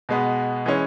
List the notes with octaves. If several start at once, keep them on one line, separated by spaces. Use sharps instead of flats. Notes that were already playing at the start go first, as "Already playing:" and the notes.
B2 G#3 B3
E3 G#3 C#4